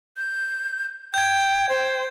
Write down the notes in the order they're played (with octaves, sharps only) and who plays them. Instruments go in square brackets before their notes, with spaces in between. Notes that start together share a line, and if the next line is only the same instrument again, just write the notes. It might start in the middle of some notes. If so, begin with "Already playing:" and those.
[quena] G6
[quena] G5 [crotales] G6 G#6
[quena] C5